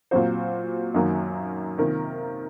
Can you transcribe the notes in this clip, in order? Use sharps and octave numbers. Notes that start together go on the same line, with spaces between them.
A#2 F#3 C4 F#4 C5
F#2 D#3 F#3 A#3
C3 D#3 A#3 F4 A#4